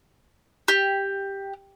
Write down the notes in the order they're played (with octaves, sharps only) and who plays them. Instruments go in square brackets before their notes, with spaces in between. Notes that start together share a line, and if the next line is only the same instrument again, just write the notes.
[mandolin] G4